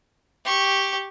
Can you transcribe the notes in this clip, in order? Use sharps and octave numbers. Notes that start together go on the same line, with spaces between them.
G4 C#6